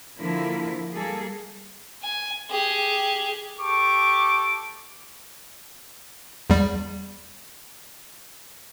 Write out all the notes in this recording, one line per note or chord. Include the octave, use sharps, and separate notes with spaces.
D3 F3 A#3 E4
G3 A#3 G#4 A4
G#5
G4 G#4
G4 A4 C#6 D6
E2 G3